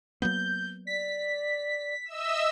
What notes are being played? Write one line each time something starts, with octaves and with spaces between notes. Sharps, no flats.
F#3 A#3 B3 G6
D5 B6
D#5 E5 E6